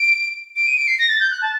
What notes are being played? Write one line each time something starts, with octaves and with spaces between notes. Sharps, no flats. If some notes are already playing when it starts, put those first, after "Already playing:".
Already playing: D7
D7
D#7
D7
C7
A#6
A6
G6
F#6
A5